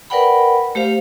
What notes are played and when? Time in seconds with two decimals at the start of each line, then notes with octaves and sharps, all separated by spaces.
0.10 A#4 B4 D5 F#5 G5 B5
0.75 A3 G4 C5 F5